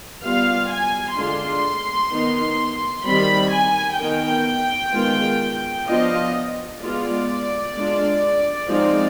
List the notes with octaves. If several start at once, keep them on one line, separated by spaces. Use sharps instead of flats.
G3 B3 F4 F5
G#5
D3 G#3 D4 F4 C6
D#3 B3 D#4
D#3 G3 C4 B5
G#5
D#3 B3 D#4 G5
D#3 G#3 B3 F4
F3 B3 D4 F4 D#5
G#3 B3 F4 D5
G#3 D4 F4
F3 G#3 C4 D#4